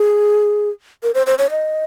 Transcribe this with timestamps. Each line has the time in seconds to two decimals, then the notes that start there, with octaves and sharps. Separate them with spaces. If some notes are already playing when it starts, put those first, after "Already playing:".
Already playing: G#4
1.03 A#4
1.15 C5
1.26 C5
1.38 C#5
1.50 D#5